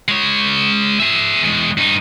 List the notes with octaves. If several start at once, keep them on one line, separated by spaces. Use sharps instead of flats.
G#3 C#5
G#4 E5
E2 G#3
G2 D#4